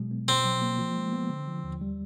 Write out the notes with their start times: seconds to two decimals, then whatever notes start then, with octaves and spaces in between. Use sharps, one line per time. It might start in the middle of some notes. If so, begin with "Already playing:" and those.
Already playing: B2 F#3 G#3
0.11 B3
0.28 B2 C4
0.45 F#3
0.62 A#3
0.79 F3
0.96 G#3
1.13 B3
1.30 D3
1.48 F3
1.64 D#2
1.81 G3